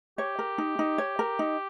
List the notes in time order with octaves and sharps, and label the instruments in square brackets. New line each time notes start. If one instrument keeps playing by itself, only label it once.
[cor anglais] G4 [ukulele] C#5
[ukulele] A#4
D#4
D#4
C#5
A#4
D#4